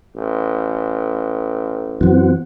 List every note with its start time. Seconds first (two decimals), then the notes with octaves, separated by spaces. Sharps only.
0.16 A1
2.01 F#2 E3 C4 F#4